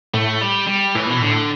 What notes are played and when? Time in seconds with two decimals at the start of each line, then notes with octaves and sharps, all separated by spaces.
0.14 A2 A3
0.41 G3
0.67 G3
0.95 A2 E3
1.07 B2 E3
1.20 A2 D3